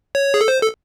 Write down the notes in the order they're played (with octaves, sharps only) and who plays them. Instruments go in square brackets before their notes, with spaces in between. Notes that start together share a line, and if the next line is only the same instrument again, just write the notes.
[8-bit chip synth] C#5
G#4
A4
C5
A4